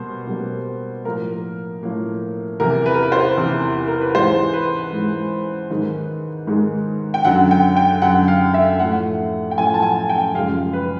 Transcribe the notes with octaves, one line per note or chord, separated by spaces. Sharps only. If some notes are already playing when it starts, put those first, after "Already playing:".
Already playing: B2 G3 A#3 C5
B2 G3 A#3
A2 F3 A#3 A#4
A2 F3 A#3
E2 C3 E3 A#4
B4
A#4
B4
C5
E2 C3 E3
A#4
B4
G#2 E3 G#3 C5
B4
G#2 E3 G#3
G#2 D#3 G#3
G#2 D#3 G#3
G5
F#2 D3 F#3 F#5
G5
G5
F#2 D3 F#3 F#5
F5
E5
A2 F3 A3 F#5
G5
A2 F3 A3 G#5
A5
G#5
G5
F#2 C#3 F3 G#3 F5
B4